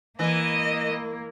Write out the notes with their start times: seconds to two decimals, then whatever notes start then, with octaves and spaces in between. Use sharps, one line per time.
0.19 E3 A#3 D#5